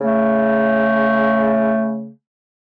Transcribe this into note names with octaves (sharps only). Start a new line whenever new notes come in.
C#3 A3